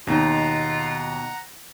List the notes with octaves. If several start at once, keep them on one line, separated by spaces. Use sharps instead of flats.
D#2 B2 D#4 F4 F#5 A#5